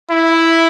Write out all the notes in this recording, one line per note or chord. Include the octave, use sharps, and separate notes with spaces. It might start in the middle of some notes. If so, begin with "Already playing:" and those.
E4